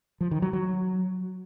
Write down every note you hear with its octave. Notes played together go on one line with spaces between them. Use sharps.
F3
D#3
F#3
F#3